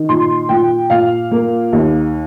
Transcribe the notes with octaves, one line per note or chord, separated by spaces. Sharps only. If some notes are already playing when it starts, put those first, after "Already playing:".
Already playing: D#3
A#2 C6
A#2 G5
A#2 F5
A#3
D#2